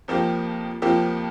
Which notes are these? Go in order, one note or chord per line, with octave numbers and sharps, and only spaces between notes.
F2 F3 A#3 G4
F2 F3 A#3 G4